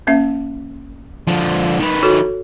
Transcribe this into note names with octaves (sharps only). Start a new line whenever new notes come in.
A#3 C#4 E5
D3 F3
D#3 B4
F#4 A4 C#5